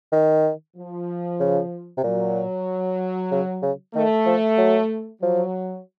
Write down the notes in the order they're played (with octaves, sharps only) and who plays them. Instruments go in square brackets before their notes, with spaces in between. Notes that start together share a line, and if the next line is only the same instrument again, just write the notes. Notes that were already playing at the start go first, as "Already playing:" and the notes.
[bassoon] D#3
[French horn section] F3
[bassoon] C#3
C3
[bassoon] A#2 [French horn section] F#3
[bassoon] C#3
C#3
[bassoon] D#3 [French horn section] A3
[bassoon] F3
F#3
[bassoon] F3 [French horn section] F#3